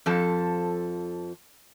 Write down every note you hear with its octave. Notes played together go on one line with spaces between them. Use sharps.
F2 F3 A4